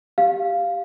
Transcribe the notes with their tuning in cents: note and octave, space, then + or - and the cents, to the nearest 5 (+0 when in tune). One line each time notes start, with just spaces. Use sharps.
G4 +0 F5 +0